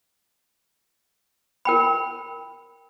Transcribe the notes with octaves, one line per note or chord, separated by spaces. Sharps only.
A#4 G5 B5